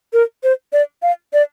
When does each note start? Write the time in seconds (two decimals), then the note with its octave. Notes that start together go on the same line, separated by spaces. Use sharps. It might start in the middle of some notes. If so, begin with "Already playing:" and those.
0.13 A#4
0.43 C5
0.73 D5
1.02 F5
1.33 D5